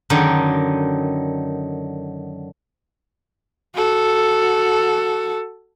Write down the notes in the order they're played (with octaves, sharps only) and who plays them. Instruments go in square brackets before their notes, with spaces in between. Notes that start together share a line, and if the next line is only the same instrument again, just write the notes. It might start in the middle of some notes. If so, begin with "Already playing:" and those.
[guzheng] F#2 D3 D#3 D#4
[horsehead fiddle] F#4 A4